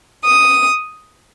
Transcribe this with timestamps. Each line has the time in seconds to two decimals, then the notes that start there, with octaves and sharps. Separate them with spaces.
0.26 D#6